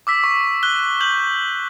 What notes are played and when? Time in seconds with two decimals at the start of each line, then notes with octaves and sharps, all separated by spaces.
0.07 D6 E6 B6
0.24 C#6
0.63 F#6 G7
1.01 G6 F#7 G7